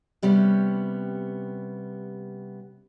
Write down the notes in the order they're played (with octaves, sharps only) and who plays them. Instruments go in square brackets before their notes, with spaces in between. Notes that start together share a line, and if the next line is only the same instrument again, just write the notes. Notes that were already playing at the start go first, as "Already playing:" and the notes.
[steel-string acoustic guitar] C3 G3 B3 C#4